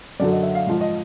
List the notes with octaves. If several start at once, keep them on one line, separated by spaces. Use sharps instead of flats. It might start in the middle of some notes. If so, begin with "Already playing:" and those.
F#2 D3 F#3 D5
D#5
E5
F5
G#2 F3
D#5